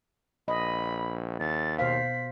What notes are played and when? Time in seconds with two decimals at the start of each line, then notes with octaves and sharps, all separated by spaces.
0.48 A#1 D#5 B5
1.40 D#2 A6
1.79 B2 C5 F5 B6